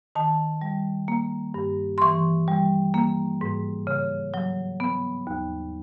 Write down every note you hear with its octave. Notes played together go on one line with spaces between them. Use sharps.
D#3 A5
G3
A#3
G2
C6
E3 C#6
G3
A#3
G#2
C#3
F#3
B3
D#2